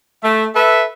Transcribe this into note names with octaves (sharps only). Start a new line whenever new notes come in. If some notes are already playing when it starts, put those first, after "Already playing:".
A3 E5
A4 B4 E5